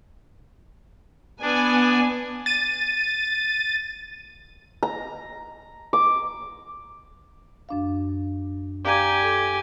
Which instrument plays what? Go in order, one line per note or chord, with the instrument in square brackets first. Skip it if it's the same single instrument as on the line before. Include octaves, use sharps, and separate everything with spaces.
[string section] B3 G#5 [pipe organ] D4
[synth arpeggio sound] A6 D#7
[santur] A#5
D6
[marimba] F#2 D4 F5
[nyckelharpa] G4 G#5 [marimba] D5 F5 A#5
[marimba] A4